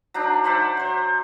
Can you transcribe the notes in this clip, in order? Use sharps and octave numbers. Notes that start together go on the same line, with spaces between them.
F#3 D4 D#4
C5 D5 E5 F#5
F#3 C5